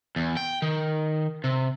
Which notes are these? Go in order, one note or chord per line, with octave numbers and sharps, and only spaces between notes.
E2
G5
D#3
C3